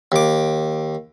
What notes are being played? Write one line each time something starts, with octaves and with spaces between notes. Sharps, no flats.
D#2 D6